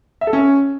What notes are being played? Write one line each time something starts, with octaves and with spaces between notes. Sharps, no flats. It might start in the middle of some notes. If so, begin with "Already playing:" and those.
E5
A4
C#4